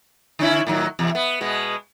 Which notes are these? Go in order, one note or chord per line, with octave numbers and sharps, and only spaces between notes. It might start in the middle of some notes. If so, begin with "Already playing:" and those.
D3 C#4 E4
A2 D#3 F#3
E2 C3
B3
B2 G#3 B3